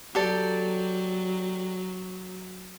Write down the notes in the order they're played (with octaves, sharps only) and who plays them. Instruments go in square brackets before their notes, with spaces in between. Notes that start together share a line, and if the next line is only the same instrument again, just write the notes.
[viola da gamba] F#3 [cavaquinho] G4 A4 D5